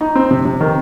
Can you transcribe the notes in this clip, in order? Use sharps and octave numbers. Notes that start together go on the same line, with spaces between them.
D#4
C4
C3
C3
D#3